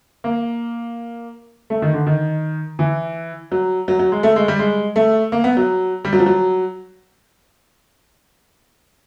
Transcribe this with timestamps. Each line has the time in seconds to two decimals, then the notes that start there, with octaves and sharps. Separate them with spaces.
0.24 A#3
1.70 A3
1.82 D#3
1.93 D3
2.06 D#3
2.79 E3
3.52 F#3
3.88 F#3
3.99 F#3
4.12 G#3
4.23 A3
4.36 G#3
4.48 G3
4.59 G#3
4.96 A3
5.32 A#3
5.44 B3
5.57 F#3
6.05 G3
6.13 F#3
6.19 F3
6.26 F#3